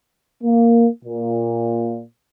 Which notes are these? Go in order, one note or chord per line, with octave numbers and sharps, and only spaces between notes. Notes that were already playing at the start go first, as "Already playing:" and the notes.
A#3
A#2